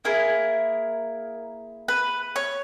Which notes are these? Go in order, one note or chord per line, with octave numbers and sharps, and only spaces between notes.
A#3 E4 G#4 A#4
B4
C#5